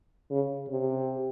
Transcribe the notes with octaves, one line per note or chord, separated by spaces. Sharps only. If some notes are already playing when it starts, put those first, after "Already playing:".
C#3
C3